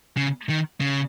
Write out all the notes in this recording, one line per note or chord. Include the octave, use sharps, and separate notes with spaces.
C#3
D#3
C#3